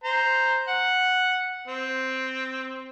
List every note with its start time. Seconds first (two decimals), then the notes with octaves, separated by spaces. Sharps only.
0.04 C5 A#5
0.68 F#5
1.68 C4